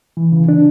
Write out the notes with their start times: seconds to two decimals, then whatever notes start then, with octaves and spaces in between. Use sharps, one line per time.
0.17 E3
0.32 C#3
0.49 D4